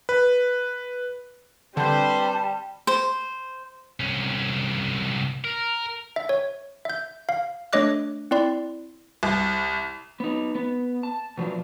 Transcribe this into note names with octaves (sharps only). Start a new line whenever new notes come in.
B4
D3 G3 C4 B4 C5 A5
C5
C2 C#4
A#4
E5
C#5
E5 G6
F5
A3 D4 C#5 D#5 D6 F#6
C4 E4 D5 C6
C2
B3 D#4
B3
A5
B2 F3 F#3 D4